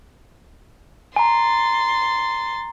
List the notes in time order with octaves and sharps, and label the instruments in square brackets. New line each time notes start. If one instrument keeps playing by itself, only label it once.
[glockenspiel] G#5 A#5 [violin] C6 A6